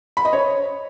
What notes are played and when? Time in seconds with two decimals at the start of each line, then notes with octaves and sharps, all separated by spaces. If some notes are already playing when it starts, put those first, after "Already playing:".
0.17 B5
0.25 D#5
0.33 C#5